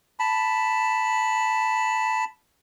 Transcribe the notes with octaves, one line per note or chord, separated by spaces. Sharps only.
A5 B5